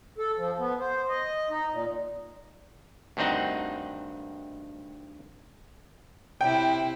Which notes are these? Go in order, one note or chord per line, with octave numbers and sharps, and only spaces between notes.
A4
F3
B3
C5
D#5
D#4
A#2
D2 G2 D#3 C4 D#4 F#5
C3 E4 G5